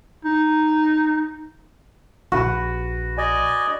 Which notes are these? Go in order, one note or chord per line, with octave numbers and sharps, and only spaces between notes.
D#4
A#1 F#4 B4
D5 D#5 G#5